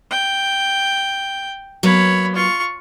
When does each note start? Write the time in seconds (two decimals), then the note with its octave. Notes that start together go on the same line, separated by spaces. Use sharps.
0.11 G5
1.83 F#3 A#3 B3 C#5 B5
2.36 F4 C#6